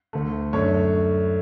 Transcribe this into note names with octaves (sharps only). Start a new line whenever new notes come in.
D2 D3 A3
F#2 D3 A3 D4 C#5